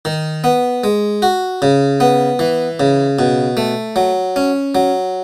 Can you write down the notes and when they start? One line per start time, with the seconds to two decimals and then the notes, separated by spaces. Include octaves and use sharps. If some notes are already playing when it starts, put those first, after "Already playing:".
0.05 D#3
0.44 B3
0.84 G#3
1.22 F#4
1.62 C#3
2.00 B3
2.39 E3
2.80 C#3
3.19 B2
3.57 A3
3.96 F#3
4.36 C#4
4.75 F#3